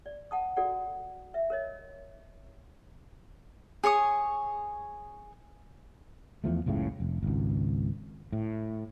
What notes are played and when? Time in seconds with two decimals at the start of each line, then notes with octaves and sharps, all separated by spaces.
0.06 D5
0.31 F#5 A5 D#6
0.56 F#4 A4 D5 F#5
1.34 E5
1.50 A#4 C#5 D#5
3.84 G#4 C#5 C#6 D#6
6.44 E2 F3 A3
6.66 F#1 C#2 A2 C#3
7.00 F1
7.23 G#1 C#2
8.32 A2